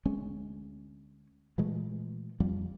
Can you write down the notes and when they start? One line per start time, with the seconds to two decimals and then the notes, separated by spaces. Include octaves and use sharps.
0.05 D2 G#3 C#4
1.58 A#2 E3 G#3 A3
2.40 F2 F3 G3